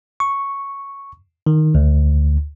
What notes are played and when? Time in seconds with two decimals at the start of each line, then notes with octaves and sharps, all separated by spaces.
0.20 C#6
1.47 D#3
1.75 D2